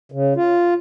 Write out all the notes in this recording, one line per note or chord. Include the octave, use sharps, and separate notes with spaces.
C#3
F4